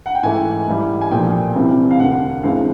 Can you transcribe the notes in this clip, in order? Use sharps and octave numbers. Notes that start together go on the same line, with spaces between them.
F#5
G5
G#2 E3 A3 G#5
G#2 E3 G3
G#5
B1 A#2 F3 A3 D4 G5
C2 C3 E3 G3 C4
F5
E1 D2 D3 F#5
G1 G2 E3 G#3 C4 F5